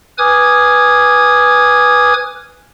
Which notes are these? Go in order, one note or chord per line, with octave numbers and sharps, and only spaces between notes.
B4 G#5 D6 D#6 F6 G#6